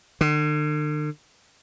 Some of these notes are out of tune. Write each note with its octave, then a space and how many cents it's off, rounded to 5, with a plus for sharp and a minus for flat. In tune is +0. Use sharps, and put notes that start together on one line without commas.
D3 +45